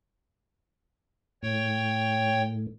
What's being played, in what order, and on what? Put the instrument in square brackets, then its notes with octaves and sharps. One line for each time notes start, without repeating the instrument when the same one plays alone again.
[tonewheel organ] A2 [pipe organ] C#5 G5